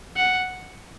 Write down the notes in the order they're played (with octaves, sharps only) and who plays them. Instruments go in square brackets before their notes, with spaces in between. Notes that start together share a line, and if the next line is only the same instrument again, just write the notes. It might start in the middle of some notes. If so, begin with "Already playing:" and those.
[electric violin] F#5